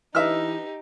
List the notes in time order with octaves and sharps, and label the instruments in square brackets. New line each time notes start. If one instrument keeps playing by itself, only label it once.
[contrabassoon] E3 [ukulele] D4 B4 D#5 [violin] D#4 G4 [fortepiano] E5 F6